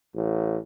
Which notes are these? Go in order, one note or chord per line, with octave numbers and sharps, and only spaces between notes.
A1